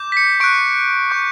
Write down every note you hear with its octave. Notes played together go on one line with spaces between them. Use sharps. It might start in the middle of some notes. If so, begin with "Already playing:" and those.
Already playing: D6 G6
B6
C#7
C#6 F#6 D7
C#6 G6